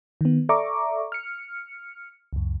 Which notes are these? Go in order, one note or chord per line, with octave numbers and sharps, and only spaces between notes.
D#3 B3
A4 D5 E5 A#5 C#6 D6
F6 C#7
C#2 F#2